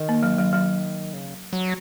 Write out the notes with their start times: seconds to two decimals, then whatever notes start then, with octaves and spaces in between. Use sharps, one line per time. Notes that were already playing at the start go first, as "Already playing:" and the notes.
Already playing: D#3
0.09 A#3
0.23 F#3
0.38 F#3
0.53 F#3
1.13 C#3
1.53 F#3